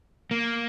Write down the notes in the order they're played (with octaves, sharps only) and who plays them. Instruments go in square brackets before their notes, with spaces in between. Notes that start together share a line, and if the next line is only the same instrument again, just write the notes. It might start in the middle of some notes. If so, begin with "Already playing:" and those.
[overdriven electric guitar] A#3